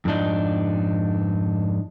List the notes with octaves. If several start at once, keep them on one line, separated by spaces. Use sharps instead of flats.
F2 G#2 D4 D#4